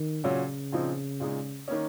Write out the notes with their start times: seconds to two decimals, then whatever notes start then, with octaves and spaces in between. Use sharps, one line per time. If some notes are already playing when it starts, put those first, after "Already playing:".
Already playing: D#3
0.24 A#2 C#3 F#3 C#4
0.72 A#2 F3 C4 D#4
1.20 A#2 G#3 D#4
1.68 D#3 A#3 C#4